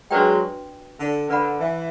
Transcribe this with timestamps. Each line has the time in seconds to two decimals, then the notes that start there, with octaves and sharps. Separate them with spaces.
0.11 F#3 G#3 D4 F#4 B4 D5 G5
1.00 D3
1.29 D3 B4 D5 F#5 B5
1.60 E3